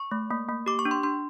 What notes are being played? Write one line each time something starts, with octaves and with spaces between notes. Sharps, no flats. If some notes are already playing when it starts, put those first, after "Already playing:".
Already playing: C#6
A3
A#3
A#3
G4 D6
C#6
D4
C6
D4 C6